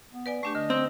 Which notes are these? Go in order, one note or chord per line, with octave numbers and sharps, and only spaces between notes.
B3
B4 D5 G#5
A3 D4 G4 C#6
D3 D#5
C4